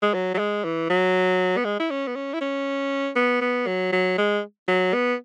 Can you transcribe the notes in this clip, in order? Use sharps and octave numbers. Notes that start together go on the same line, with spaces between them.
G#3
F#3
F#3
G#3
E3
F#3
B3
G#3
E4
C#4
B3
C#4
E4
C#4
B3
B3
F#3
F#3
G#3
F#3
B3